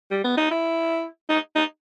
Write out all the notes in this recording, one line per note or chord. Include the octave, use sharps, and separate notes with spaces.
G3
B3
D#4
E4
D#4
D#4